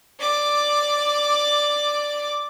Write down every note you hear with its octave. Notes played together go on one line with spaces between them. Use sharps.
D5 D6